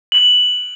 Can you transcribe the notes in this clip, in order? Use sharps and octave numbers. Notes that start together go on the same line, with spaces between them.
F#7